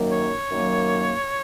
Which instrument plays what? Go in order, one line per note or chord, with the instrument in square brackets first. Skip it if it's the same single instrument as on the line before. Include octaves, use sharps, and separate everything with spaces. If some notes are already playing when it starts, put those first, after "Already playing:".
Already playing: [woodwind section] F#2 D#3 F#3 A#3
C#5
F#2 D#3 F#3 A#3